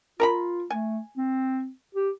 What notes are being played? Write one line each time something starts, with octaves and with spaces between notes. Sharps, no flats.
F4 A#4 A#5 B5
A3 G#5
C4
G4